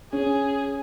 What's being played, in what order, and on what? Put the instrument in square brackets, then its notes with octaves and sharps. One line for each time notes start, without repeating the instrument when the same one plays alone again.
[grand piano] C#4 [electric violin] G#4